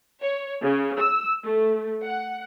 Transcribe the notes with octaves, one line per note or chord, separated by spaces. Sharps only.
C#5
C#3
E6
A3
F#5